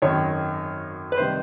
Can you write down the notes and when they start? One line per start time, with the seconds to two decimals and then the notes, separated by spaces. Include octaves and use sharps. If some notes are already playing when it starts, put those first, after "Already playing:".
0.02 G#1 F#2 D#3 C#5
1.12 B4
1.17 C3 D#3 G3 C5